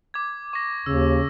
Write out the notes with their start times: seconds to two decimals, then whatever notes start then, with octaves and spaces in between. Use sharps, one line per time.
0.14 D6 G#6
0.53 C#6 A#6
0.86 D#2 C#3 E6